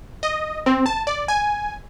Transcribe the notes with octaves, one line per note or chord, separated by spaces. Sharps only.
D#5
C4
A5
D5
G#5